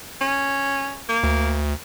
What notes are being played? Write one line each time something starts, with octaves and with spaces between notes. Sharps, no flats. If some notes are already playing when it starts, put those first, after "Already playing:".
C#4
A#3
D2